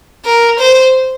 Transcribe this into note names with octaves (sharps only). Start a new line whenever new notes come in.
A#4
C5